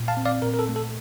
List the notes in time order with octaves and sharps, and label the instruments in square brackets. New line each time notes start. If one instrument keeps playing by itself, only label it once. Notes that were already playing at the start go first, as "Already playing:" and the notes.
Already playing: [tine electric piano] A#2
F5 A5
C4
D5 F5
A#2 A#4
A#4
A4
A3
A4